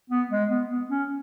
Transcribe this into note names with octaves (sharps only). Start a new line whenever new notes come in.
B3
G#3
B3
B3
C#4